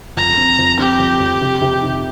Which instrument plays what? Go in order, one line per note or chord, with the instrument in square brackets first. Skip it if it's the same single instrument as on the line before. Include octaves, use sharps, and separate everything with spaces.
[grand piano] F2 [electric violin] A#5
[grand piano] C4
F2
[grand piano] C4 [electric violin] G4
[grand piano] F2
F2
C3
C3
D#3